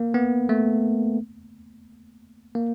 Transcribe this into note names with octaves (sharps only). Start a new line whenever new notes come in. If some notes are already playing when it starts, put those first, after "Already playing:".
Already playing: A#3
B3
A3
A#3